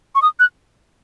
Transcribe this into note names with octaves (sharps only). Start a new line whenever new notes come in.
C#6
D#6
F#6